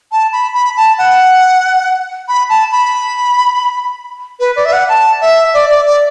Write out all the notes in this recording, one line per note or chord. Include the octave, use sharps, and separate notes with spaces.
A5
B5
B5
A5
F#5
B5
A5
B5
B4
D5
E5
F#5
A5
E5
D5
D5
D5